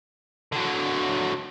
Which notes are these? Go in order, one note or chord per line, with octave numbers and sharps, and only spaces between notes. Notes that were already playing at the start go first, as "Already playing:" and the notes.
D3 F#3